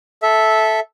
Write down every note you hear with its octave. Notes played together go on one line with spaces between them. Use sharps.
A4 E5